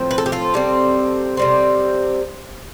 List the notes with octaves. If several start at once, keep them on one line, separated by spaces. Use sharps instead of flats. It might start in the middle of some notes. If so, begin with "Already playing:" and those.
Already playing: A2 F3 C4
B4
A4
G4
F4 A4
C3 G3 C4
C3 G3 C4